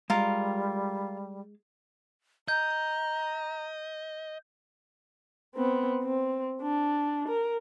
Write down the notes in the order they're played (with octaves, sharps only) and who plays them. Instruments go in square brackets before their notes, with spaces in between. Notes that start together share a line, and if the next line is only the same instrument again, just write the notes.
[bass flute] G3 [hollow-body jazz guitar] G#3 F5 [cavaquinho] F4 A#4
[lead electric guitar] D#5 [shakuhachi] A#5 [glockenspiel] G6
[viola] B3 C4
C4
D4
A#4